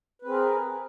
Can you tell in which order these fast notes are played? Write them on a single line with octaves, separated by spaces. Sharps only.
B4 C4 G#4 A#4